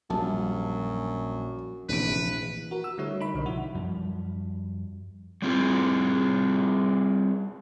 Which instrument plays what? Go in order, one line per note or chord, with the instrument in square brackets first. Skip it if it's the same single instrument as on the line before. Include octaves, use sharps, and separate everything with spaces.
[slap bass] A#1 [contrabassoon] F#2 [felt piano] G3 A5
[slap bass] F1 [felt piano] A#1 E3 D7 [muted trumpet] B4
[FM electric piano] F#4 A#4
E6
D3 G3 A3 E4 C#5
D#4 A#4 B5
B1 D3
C#3 F3 E4 F#4
[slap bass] F#2 F3 G3
[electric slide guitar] G3 C4 F4 G#4